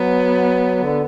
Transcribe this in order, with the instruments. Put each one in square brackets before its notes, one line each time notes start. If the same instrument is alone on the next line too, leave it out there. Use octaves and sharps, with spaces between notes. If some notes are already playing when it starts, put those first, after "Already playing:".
Already playing: [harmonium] F#3 [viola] B3
[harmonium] D3